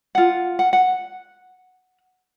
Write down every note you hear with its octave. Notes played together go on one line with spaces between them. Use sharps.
F4 F#5
F#5
F#5